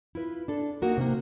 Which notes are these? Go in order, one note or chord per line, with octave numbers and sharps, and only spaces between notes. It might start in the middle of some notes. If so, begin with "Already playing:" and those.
E4 F4 B4
D4 A4
A#3 D#4 F#4 A#4
C3 A#3